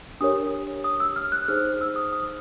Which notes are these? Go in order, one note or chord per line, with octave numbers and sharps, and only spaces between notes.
D4 G4 A#4 C#5 D#6
D#6
E6
F6
F#6
D#4 G#4 C5 F6
E6
D#6
D#6